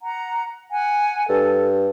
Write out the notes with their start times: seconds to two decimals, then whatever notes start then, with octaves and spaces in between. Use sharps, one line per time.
0.01 F#5 A#5
0.72 F#5 G#5
1.29 G2 A4